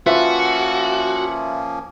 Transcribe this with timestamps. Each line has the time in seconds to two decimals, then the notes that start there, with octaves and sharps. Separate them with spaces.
0.06 F3 A#3 C#4 F4 F#4 B4 E5